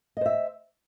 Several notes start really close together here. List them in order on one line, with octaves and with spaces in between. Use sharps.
D#5 C5 E5